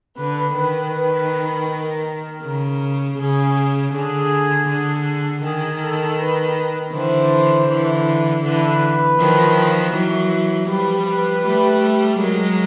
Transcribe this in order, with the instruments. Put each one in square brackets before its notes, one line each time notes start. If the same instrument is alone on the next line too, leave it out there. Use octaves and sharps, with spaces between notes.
[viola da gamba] D3 [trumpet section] B4
[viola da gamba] D#3 [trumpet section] B4
[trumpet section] B4
A#4
[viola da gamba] C#3
[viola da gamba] C#3 [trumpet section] G#4
[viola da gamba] D3 [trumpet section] G#4
[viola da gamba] D3
[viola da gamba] D#3 [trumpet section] G#4
[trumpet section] A4
B4
[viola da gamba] D3 E3 [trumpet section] C5
[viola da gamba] D3 E3
[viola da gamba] D3 E3 [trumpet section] B4
[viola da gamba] D#3 F3
E3 F#3
[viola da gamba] F3 G3 [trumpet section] B4
[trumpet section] B4
[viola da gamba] G3 A3
[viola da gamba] F#3 G#3 [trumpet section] A#4